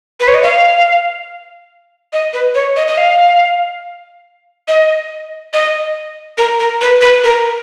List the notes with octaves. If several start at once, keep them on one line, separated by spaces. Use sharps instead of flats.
B4
C#5
D#5
F5
D#5
B4
C#5
D#5
D#5
F5
D#5
D#5
A#4
A#4
B4
B4
A#4